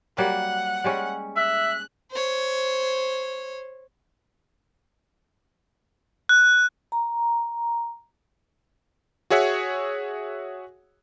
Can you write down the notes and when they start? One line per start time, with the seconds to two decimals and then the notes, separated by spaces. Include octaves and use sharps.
0.18 F#3 G3 A#3 F#5
0.84 G3 G#3 C#4
1.37 E5 F#6
2.11 C5 C#5
6.29 F#6
6.92 A#5
9.30 F#4 G#4 C#5 E5 F#5